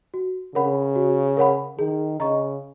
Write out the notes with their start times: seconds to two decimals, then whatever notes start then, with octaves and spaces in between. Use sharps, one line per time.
0.14 F#4
0.55 C#3 A#4 C#5 F#5 B5
0.96 F#4
1.37 A#4 C#5 F#5 B5
1.79 D#3 G#4
2.20 C#3 D#5 A#5 C#6